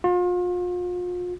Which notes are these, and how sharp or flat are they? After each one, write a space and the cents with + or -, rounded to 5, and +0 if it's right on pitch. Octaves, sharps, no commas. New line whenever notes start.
F4 +40